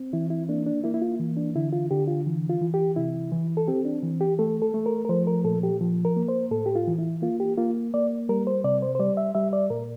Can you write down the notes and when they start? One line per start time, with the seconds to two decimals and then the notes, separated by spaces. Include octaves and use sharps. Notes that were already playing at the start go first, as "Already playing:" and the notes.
Already playing: C4
0.13 E3 E4
0.30 E4
0.49 A#3 D4
0.66 D4
0.84 A#3 E4
0.94 E4
1.02 F4
1.19 E3
1.37 D4
1.56 D3 E4
1.72 F4
1.91 D3 G4
2.08 F4
2.26 E3
2.49 F4
2.61 E3
2.74 G4
2.96 C3 E4
3.32 E3
3.57 A4
3.68 C4 G4
3.85 D4
4.03 E3
4.21 G4
4.39 A3 A4
4.62 A4
4.74 A3
4.86 A#4
5.05 A#4
5.09 F3 C5
5.27 A#4
5.45 A#2 A4
5.63 G4
5.81 F3
6.05 A#4
6.16 A#3
6.29 C5
6.51 A2 A4
6.66 G4
6.75 F4
6.87 E3
6.99 E4
7.22 A#3 F4
7.40 G4
7.58 A#3 F4
7.94 A#3 D5
8.29 G3 A#4
8.47 C5
8.64 C3 D5
8.82 C5
8.95 C5
9.00 G3 D5
9.17 E5
9.35 G3 E5
9.53 D5
9.70 A#2 A#4